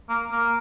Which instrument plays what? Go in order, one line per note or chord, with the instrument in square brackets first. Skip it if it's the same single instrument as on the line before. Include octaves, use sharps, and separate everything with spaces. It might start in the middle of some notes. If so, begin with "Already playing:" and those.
[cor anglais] A#3
A#3